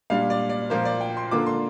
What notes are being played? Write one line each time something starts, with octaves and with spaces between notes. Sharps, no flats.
A#2 G3 D4 F5
D5
D5
A#2 F3 A#3 F4 C5
D5
G5
C6
D3 A#3 D4 F4 D6
C6